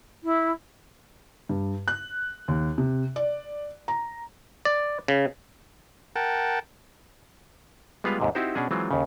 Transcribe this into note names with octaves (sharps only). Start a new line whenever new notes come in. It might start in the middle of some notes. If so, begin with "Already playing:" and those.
E4
G2
F#6
D#2
C3
D5
A#5
D5
C#3
A#4 F#5 G5 A5
G3 G#3 B3 F4 B4 F5
D#2 G#2 C3
C4 D#4 E4 F#4 G4 C5
B2 C#4 D4 G#4
E3 F#3 G#3 C4 F4
D#2 C#3